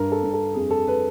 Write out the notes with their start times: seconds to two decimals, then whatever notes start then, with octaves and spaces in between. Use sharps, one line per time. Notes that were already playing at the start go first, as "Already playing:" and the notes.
Already playing: G2 A#4
0.12 A4
0.23 G2
0.33 A4
0.54 F2 G#4
0.70 A4
0.88 B4